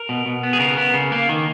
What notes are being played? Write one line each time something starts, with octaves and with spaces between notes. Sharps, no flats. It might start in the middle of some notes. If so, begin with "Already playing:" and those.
Already playing: A#4
B2
B2
B3
G#4
C#3 A#4
B3
C#3
A#3
D#3